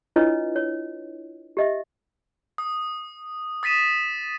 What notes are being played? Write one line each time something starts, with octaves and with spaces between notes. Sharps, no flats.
D4 E4 F4 B4 C#5 D#5
C#5
G4 D#5 E5
D#6
D#6 A6 B6 D#7 E7